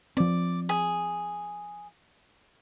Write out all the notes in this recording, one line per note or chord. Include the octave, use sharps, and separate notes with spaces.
F3 C4 D5
G#4